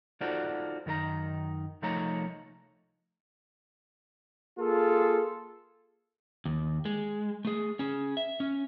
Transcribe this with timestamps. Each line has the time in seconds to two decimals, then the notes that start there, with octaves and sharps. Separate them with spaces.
0.21 D#4 F4 F#4 A4 C5 D5
0.86 F#2 D#3 D#4 A#4 A#5
1.82 C2 F3 A3 D#4 C#5 A#5
4.59 A#3 F4 G#4 A4
6.45 D#2
6.85 G#3
7.45 A3 G#4
7.79 C#4 G#4
8.17 E5
8.40 C#4